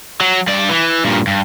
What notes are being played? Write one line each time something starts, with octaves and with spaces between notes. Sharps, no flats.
F#3
G2 D5
E3
G2 A#2
G2